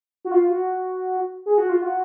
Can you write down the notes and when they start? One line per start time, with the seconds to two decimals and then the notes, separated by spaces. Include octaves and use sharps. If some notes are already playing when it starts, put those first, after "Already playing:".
0.25 F#4
0.31 F4
0.50 F#4
1.46 G#4
1.58 F#4
1.69 F4
1.82 F#4